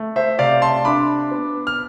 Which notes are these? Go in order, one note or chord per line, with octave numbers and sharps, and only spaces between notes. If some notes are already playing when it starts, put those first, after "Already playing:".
Already playing: A3
C5 E5
C3 D5 F5
A5 C6
D4 B5 D6
B3
F6